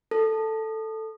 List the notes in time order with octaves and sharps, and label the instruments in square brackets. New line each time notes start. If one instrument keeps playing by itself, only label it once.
[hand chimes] A4